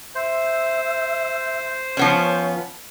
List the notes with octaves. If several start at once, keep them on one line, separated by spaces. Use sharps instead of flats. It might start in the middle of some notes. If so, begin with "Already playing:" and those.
C5 E5
F3 B3 C#4 C#5